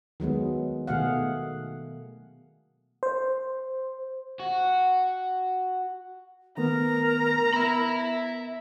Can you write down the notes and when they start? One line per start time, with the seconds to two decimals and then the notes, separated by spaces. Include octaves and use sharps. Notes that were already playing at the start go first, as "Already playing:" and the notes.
0.20 D#3 F#3 G#3 B3
0.88 B2 D#3 A3 G#4 F5 F#5
3.03 C5
4.40 F#4
6.57 D#3 A3 B3 A#4 A#5
7.54 B3 E5 B5